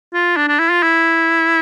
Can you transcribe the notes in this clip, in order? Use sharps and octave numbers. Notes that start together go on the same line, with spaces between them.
F4
D4
D4
E4
F4
E4